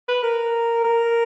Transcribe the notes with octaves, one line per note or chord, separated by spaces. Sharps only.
B4
A#4
A#4